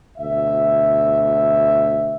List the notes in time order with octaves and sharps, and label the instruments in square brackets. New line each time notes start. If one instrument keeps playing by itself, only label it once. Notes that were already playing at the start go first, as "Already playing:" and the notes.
[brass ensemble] D2 B2 E5